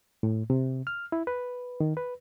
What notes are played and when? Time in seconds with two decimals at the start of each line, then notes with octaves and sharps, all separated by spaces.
0.23 A2
0.50 C3
0.87 F6
1.12 E4
1.27 B4
1.80 D#3
1.97 B4